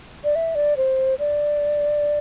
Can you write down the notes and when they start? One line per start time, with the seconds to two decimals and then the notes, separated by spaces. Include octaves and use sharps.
0.24 D5
0.35 E5
0.55 D5
0.77 C5
1.19 D5